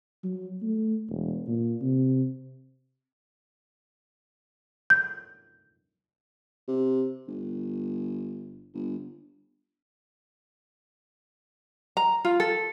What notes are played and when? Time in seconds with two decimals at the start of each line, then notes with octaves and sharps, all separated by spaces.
0.24 F#3
0.62 A3
1.09 E1
1.48 A#2
1.81 C3
4.90 G6
6.68 C3
7.28 G1
8.74 G1
11.97 A#5
12.25 F4
12.40 A4